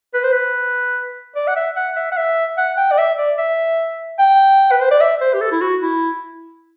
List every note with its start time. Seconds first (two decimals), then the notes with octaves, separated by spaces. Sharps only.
0.14 B4
0.23 C5
0.32 B4
1.35 D5
1.47 F#5
1.56 E5
1.76 F#5
1.96 E5
2.12 F#5
2.17 E5
2.57 F#5
2.77 G5
2.91 D5
2.98 E5
3.18 D5
3.38 E5
4.19 G5
4.71 B4
4.81 C5
4.91 D5
5.01 E5
5.21 C5
5.34 G4
5.41 A4
5.52 E4
5.61 F#4
5.82 E4